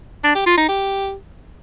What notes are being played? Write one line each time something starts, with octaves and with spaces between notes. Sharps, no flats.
D4
G4
F4
D#4
G4